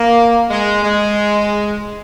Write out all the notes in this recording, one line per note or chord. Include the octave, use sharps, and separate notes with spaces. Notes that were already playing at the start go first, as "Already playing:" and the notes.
Already playing: A#3
G#3
G#3